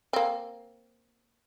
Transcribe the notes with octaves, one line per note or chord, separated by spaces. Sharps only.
A#3 C4